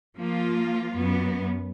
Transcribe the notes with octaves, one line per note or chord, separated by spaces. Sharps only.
F3 A#3 F4
F#2 B3